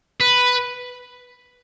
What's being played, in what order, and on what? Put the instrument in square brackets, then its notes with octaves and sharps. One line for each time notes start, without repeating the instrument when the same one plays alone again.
[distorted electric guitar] B4